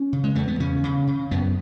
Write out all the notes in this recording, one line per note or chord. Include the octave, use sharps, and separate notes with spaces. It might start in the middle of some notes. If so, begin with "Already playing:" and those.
Already playing: C#4
C#3
G#3
E2 A3
B3
C#3 C#4
C#3
C#3
F#2 B3